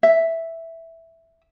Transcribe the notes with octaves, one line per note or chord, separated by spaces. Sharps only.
E5